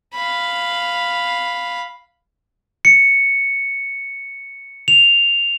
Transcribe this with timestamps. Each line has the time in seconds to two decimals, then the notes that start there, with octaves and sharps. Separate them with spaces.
0.14 F5 B5
2.85 C#7
4.88 F7